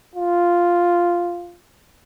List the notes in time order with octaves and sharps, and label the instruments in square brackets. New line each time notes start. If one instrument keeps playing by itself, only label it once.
[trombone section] F4